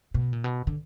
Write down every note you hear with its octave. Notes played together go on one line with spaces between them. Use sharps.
B2
A#2
B2
D3